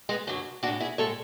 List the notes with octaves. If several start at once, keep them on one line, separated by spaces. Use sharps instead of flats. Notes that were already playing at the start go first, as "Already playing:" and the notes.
G#3 B3
F#2 D3 F#3
A2 G#3 D4 F#4
E4 G#4
A2 G#3 A4 C#5